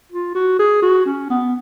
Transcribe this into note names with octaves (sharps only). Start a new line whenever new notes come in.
F4
F#4
G#4
F#4
C#4
B3